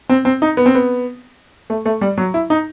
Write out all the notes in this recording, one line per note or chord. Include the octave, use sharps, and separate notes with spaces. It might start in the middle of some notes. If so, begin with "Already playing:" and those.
C4
C4
D#4
B3
C4
B3
A3
A3
G3
F#3
E4
D#4